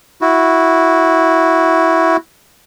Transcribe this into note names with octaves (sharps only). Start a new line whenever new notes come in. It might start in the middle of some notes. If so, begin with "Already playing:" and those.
E4 F#4